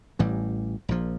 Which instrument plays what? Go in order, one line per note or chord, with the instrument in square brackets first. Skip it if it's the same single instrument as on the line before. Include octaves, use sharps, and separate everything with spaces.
[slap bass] A1 A2 E3 G3
A#1 A#2 F3